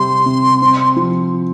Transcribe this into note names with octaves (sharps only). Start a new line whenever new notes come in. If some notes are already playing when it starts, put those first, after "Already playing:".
Already playing: C3 G3 C4 C6
C3
C4
F3